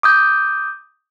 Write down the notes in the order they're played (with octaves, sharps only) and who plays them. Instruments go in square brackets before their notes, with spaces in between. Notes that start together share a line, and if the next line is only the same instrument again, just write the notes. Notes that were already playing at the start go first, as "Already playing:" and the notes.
[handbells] D6 D#6 G6